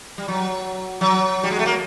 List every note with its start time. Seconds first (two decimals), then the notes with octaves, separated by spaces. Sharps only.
0.18 G3
0.28 F#3
1.01 F#3
1.43 G3
1.51 G#3
1.59 A3
1.66 A#3